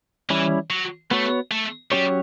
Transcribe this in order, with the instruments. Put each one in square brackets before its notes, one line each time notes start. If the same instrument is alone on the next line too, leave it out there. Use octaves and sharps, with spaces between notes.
[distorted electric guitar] E3 [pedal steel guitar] G3 C#4 E4
[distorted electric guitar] F#3
[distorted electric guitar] A3 [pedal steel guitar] B3 F#4 C#5
[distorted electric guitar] A3
[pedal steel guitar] F#3 C#4 G4 C#5 [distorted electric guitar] G3